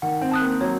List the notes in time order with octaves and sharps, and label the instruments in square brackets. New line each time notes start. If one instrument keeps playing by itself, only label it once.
[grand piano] D#3 [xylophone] F#5
[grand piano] C4
[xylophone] A5 D#6 F#6
[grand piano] A#3
[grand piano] F#3 [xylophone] C#5